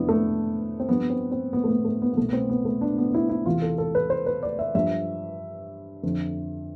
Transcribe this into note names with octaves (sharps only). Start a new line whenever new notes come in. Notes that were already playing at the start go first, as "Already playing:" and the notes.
Already playing: F2 C3 F3 B3 D4 E4
A3
C4
G2 F3 B3
C4
C4
B3
A3
B3
A3
B3
B3
C2 B2 A3
B3
C4
B3
A3
D4
B3
D4
E4
E4
E2 C3 E3 F4
A4
A4
B4
C5
B4
D5
E5
G2 F3 E5
F2 D3 F3